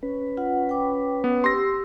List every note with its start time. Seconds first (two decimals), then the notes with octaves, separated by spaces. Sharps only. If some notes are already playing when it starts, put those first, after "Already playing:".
0.03 C#4 B4
0.37 F4 F#5
0.69 G5 D6
1.24 B3
1.44 G4 C6 E6 A#6